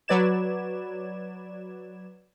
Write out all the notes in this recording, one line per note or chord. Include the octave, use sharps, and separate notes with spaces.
F#3 B4 D5 G#6 E7